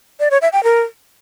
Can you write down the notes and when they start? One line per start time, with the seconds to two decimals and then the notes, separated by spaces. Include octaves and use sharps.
0.20 D5
0.31 C#5
0.42 E5
0.53 G5
0.64 A#4